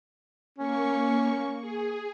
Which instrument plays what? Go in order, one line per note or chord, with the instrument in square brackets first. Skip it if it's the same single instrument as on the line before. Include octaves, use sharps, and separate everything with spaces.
[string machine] A#3 C#6 [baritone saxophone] C#4
[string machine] G#4